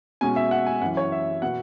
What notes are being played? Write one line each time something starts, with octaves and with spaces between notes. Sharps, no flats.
B2 G#3 C#4 G#5
E5
F#5
G#5
F#2 E3 C#4 F#5
C#5
E5
B2 B3 F#5